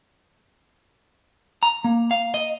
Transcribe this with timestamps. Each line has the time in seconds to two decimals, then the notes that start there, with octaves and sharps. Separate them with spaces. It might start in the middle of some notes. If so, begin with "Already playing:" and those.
1.63 A#5
1.84 A#3
2.11 F5
2.34 D#5